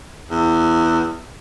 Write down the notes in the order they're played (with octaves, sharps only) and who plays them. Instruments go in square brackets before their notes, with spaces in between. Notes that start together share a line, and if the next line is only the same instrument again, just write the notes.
[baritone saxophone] E2